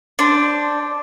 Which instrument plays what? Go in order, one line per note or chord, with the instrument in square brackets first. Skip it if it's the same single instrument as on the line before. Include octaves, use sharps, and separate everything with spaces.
[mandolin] D4 C5